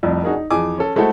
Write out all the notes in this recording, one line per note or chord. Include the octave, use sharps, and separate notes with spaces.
F1 C2 F2
D4 D#4 F#4 G#4 A#4
D#4
F2 E3 G#4 G#5 D6
C#4 A4
G#3 A3 E4 F#4 A4 C5